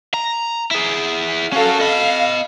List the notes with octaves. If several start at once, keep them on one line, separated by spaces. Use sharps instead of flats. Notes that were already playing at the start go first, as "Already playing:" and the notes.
A#5
E4 G#4
C#4 F#4 A4 F5
D#5 F5 B5